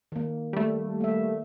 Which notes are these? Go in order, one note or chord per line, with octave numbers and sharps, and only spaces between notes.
D#3 A#3
G3 A3
A#3 E5